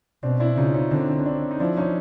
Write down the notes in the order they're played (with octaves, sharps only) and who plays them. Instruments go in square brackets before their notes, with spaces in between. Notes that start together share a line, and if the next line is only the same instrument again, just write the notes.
[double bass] B2 [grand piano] C4 D4
[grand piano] D4 E4
[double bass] C#3 [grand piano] D#4 F4
[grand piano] C#4 D#4
[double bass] D3 [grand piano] C4 D4
[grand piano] C#4
C4 D4
D#4
[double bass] F3 [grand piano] D4 E4
[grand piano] C#4 D#4